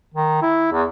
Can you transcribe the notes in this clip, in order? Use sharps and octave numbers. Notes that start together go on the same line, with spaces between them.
D#3
E4
E2